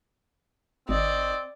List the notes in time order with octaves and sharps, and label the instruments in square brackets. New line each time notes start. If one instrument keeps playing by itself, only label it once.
[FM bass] G#1 [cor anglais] C4 [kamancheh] D5 D#5